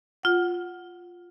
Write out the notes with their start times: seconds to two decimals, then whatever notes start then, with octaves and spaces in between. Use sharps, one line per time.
0.23 F4 F#5